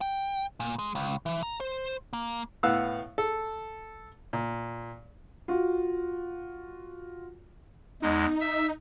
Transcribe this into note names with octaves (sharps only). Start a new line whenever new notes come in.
G5
A#2
G#3
C#2
E3
A#5
C5
A#3
A2 B3 F5 F#5 E6 F#6
A4
A#2
F4 F#4
E2 G#3 D#4
E5 E6